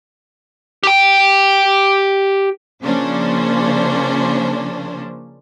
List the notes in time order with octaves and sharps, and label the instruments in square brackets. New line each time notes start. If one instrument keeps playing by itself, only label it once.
[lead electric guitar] G4 G5
[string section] C#3 F3 A#3 C#4 D4 C5